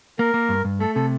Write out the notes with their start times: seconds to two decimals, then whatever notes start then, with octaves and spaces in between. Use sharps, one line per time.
0.19 A#3 A#4
0.34 A#3
0.49 G2
0.65 G2
0.80 A3 A4
0.95 C3 A4